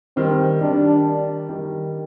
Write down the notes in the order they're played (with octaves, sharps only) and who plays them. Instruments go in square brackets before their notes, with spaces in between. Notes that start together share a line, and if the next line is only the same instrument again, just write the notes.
[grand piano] D#3 G3 [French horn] C4
[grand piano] D#3 G3 [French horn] D4
[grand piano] D#3 G3